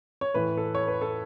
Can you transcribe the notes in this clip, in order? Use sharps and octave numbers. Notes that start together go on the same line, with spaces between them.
C#5
A2 E3 B4
A4
C#5
B4
A4